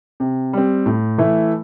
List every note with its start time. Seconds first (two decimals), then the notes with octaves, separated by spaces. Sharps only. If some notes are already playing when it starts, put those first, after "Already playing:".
0.20 C3
0.53 G3 C4
0.86 A2
1.18 E3 A3 E4